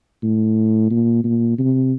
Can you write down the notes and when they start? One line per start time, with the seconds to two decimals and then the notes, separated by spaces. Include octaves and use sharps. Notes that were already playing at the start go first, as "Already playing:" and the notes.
0.23 A2
0.90 A#2
1.24 A#2
1.58 C3